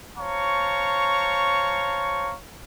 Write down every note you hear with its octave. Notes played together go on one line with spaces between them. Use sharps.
C5 C#5 F5 A5 A#5 C#6